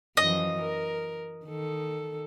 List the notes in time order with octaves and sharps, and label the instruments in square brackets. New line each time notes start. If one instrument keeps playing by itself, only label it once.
[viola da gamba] F#2 E3 F3 [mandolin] D#5
[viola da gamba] A#4
D#3 A4